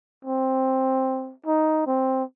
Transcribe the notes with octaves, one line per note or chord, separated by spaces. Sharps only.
C4
D#4
C4